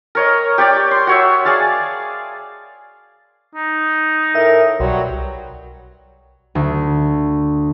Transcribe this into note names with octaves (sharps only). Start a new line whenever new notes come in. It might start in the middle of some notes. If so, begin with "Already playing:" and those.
A#4 C#5 D#5
G4 C#5 D5 G5
C6
F#4 C#5 E5
G#4 D5 F5 A5
D#4
A2 A#4 E5
B1 F#3 G3 F#4
D2